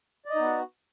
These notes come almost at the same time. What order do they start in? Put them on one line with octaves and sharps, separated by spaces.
D5 D#5 D#4 B3 F#4